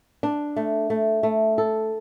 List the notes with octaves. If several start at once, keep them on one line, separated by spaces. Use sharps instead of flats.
D4
A3
A3
A3
A4